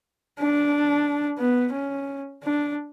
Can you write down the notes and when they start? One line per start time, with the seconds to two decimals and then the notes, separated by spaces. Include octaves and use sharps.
0.39 D4
1.38 B3
1.73 C#4
2.44 D4